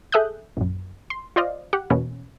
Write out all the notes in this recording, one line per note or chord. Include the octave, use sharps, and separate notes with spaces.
G#4 A4 E5 D#6 F#6 G6
A#1 F#2
C6
F4 C5 D5 D#5 F5
G4 F#5
E2 B2 A#3 C#4